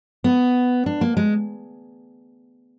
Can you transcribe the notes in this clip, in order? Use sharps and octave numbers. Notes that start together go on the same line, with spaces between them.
B3
D4
A#3
G#3